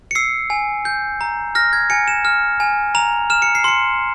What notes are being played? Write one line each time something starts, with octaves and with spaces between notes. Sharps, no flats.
C#7
E6 C7
G#5
G6
A#5
F6 A#6
G#6
G#5 C#7
E7
F6
G#5
A#5 F7
F6 E7
C#7
C7
C6 C#7